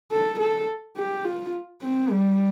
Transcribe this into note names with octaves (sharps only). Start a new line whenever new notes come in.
A4
A4
G4
F4
C4
G3